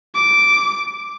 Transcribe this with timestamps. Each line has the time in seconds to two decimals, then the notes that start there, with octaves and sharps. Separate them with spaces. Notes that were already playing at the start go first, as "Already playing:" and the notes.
0.15 D6